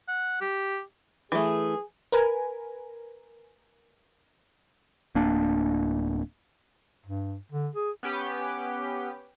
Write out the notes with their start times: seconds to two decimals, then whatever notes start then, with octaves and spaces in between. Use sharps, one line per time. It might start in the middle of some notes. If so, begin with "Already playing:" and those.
0.08 F#5
0.41 G4
1.32 E3 A3 G#4
2.12 A#4 B4 G#5
5.15 D1 A#3 D4
7.06 G2
7.52 D3
7.75 G#4
8.03 B3 C#4 G4 B4